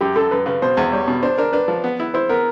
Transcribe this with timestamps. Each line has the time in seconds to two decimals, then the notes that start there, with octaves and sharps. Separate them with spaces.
0.01 F#2 G4
0.15 F#2 A4
0.31 F#2 B4
0.46 C#3 B4
0.62 B2 C5
0.77 E2
0.92 G3 C#5
1.08 B2
1.23 D4 C5
1.38 D4 A#4
1.53 D4 B4
1.68 F3
1.84 B3
2.00 E4
2.14 E4 C5
2.29 B3 A#4